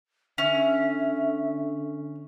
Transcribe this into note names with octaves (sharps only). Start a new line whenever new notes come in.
D3 C#4 E5